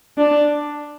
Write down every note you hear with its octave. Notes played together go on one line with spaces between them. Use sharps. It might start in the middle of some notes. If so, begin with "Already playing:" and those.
D4